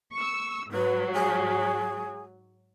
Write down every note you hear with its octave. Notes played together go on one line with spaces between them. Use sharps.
C#6 E6
G#2 F#3 B4
G#4